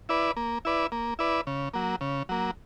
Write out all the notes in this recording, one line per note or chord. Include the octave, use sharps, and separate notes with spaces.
E4 B4 D5
A#3
E4 B4 D5
A#3
E4 B4 D5
C#3
F#3 A#3
C#3
F#3 A#3